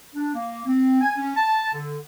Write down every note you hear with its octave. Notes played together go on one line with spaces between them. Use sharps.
D4
A#3
C4
G#5
C#4
A5
D3